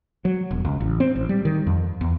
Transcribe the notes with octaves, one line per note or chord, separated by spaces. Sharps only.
F#3
E1
C#2
A1
C4
A1
G3
D#3
F2
E2